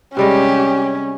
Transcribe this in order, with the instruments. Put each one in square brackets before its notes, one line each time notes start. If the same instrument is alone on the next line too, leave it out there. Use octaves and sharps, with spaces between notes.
[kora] C3 G3 G#3 [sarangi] C#4 [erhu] G4